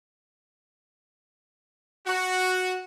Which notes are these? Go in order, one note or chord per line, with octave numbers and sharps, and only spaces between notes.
F#4